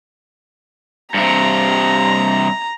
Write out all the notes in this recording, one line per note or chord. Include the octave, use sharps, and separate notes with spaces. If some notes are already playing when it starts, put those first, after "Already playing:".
G2 C3 A#5